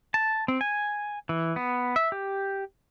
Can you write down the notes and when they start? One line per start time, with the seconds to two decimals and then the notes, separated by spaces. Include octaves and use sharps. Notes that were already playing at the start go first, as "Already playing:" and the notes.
0.14 A5
0.48 C4
0.61 G#5
1.29 E3
1.56 B3
1.96 E5
2.12 G4